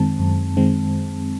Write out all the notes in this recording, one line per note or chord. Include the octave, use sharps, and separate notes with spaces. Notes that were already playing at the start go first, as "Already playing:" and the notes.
Already playing: F#2 D#3 G#3 C4 A5
F#2
D#3 G#3 C4